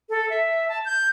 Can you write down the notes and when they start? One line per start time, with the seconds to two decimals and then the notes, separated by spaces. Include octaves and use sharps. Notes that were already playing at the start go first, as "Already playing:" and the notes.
0.10 A4
0.30 E5
0.69 A5
0.85 G6